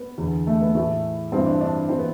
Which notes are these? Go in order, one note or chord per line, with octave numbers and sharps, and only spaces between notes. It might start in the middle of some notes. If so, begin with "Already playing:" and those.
Already playing: B3
E2 D3
A3
B3
A2 E3 A3
G2 E3 C4
D4
D4
E3 C4
B3